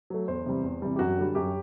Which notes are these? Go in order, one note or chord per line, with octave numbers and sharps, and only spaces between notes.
F#3 A3
E2 C5
C3 E3 G3
E2
C3 E3 G3
G4
F#2 F#4
D3 G3
F#2 G4